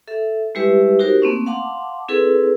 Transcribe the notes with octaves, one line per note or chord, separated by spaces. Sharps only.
A4 E5
G3 G#3 E4 G4 B4 E5
D#4 F#4 G4 A#4 C5
A3 A#3 C4 C#4
F5 F#5 A5 C6 D6
C4 E4 G#4 A4 B4